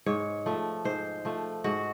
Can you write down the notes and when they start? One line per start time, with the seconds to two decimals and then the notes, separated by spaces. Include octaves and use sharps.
0.06 G#2 C#5
0.46 F3 A3
0.85 G#2 C5
1.25 F3 A3
1.64 G#2 F#4